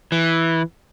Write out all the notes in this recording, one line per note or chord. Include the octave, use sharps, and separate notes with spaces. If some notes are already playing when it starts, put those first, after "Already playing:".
E3